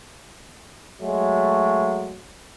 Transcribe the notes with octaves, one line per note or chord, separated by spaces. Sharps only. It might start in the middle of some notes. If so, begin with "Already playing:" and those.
F#3 G#3 A3